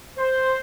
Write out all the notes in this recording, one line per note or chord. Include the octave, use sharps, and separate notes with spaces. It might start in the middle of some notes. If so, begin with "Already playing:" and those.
C5